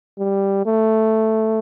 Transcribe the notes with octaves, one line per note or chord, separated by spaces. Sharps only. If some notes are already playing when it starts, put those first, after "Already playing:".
G3
A3